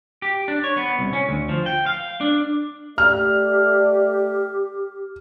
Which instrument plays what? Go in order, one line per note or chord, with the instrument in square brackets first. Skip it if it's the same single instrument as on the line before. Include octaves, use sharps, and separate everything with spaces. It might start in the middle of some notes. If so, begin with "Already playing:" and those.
[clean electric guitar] G4
D4
C#5
B3
C2
C#4
D2
F3
G5
F5
D4
[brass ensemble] A3 D5 [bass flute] G4 [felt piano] F6